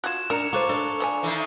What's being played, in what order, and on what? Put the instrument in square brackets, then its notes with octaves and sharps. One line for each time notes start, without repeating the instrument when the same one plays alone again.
[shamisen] F4 F#4 [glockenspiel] F#6 G#6 E7
[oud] D4 [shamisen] A#4 [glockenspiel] A#5 C#7 F7
[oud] F4 A4 C5 [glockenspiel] C#6 D6 F#6
[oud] D4 [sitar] A4
[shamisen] F3 C#5 G#5
[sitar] D#3 E3